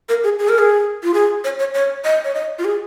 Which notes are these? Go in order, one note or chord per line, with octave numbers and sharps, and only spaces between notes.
A#4
G#4
G#4
A#4
G#4
F4
G#4
C#5
C#5
C#5
D#5
C#5
D#5
F4
G#4